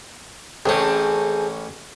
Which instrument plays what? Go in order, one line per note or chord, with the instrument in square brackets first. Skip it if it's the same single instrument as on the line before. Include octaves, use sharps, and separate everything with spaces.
[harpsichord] A1 C#4 [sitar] A3 C4 G#4